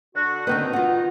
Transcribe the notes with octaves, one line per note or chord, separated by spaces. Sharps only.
D3 F#4
B2 D3 D#3 C4 D#4 B4
F4 F#5